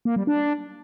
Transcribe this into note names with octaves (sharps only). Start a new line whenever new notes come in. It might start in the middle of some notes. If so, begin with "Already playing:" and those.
A#3
G3
D4